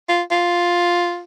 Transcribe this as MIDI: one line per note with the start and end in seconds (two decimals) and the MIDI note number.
0.09 0.22 65
0.31 1.22 65